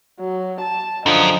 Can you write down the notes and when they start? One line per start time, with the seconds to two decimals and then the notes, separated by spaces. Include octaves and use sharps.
0.20 F#3
0.61 A5
1.06 F#2 D3 F3 D#5 D#6